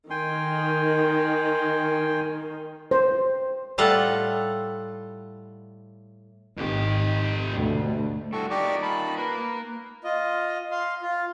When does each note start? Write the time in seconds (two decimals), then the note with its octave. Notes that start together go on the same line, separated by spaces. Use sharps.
0.10 D#3 G5 G#5 C6
2.91 C5
3.78 A2 G3 F4 A4 F#5
6.57 G#1 F2 D#3 G4
7.53 D2 B2
8.33 G3 E4 F#4 A4 C#6
8.50 D#4 F4 G4 A#4 D5 C#6
8.82 A5 B5
9.18 A#3 A#4 B4
10.04 F4 D#5
10.71 F5 C6
11.02 F4